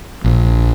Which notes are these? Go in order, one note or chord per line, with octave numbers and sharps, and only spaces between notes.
A#1